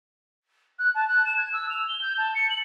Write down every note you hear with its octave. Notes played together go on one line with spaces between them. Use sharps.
F#6
A5
F#6
E7
G#6
E6
F7
G7
G6
A5
C#7
F#7